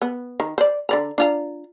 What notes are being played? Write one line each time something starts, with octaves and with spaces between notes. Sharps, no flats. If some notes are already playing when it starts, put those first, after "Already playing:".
B3
D#3
C5 D5
D3 D5 A#5
D4 F4 A#5